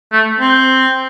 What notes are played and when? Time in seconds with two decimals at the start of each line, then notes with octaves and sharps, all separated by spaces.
0.13 A3
0.40 C4